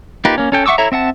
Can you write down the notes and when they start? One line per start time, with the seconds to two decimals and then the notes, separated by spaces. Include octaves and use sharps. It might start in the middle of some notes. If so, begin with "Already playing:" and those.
0.25 A#3 D#4 F4 G4 B4
0.38 A#3 C#4
0.52 C#4 A4 G5
0.66 E5 F#5 C#6 D6 E6
0.78 E4 A4 C#5 E5 A#5
0.92 C4 E5 F#5 A5